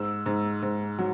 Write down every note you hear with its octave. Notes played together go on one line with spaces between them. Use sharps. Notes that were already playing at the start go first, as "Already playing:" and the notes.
Already playing: G#2 E6
G#2
G#2
F#3